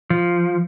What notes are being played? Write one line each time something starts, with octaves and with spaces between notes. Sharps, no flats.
F3